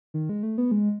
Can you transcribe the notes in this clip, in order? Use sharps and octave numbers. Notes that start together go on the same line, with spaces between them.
D#3
G#3
A3
B3
G#3